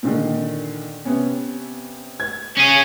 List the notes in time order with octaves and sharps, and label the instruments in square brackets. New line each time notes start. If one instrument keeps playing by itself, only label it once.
[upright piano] A#2 D3 D#3
C3 B3 C#4
G#6
[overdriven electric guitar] C#4 G#4